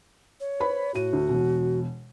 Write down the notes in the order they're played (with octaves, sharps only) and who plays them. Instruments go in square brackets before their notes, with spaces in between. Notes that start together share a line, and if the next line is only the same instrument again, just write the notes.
[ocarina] C#5
[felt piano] B4 C5 B5
[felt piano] A2 D#7 [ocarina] F#4
[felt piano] D2
E1 B2